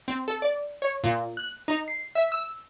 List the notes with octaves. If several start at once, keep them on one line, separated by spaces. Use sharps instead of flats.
C4
A4
D5
C#5
A#2
F#6
D#4
C7
E5
E6